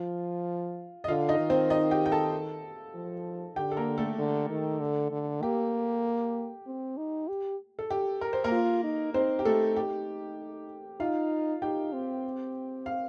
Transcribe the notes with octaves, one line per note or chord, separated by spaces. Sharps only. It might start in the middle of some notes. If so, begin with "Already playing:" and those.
Already playing: F3 F4
D#5
D3 F4 F5
D#4 D#5
D#3
C4 C5
D#4 D#5
G4 G5
G5
A4 A5
F3
D3 G4 G5
A4
A#3 A#4
A3 A4
D3
D#3
D3
D3
A#3 G4
C4
D#4
G4
A4
G4
A#4
C5
A#3 A#4
F4
D#4
C4 D#4 C5
G4
A3 D#4 A4
G4
D#4 F4 F5
D#4 G4 G5
C4
F5